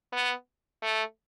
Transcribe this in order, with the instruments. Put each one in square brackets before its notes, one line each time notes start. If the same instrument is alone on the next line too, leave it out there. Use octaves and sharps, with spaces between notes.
[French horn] B3
A3